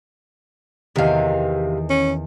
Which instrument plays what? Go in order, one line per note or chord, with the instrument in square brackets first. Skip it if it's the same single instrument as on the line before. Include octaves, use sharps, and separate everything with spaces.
[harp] E2 D#3 [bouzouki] C3 F5
[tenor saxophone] C#4